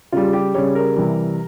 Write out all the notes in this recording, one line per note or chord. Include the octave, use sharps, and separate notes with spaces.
C#3 G3 F4
G4
C#3 G3 C#5
A#4
C3 E3 G3